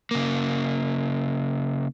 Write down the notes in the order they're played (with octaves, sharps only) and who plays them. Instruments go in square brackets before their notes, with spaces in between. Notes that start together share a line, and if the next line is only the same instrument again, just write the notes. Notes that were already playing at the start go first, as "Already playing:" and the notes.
[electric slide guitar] C#3 A#3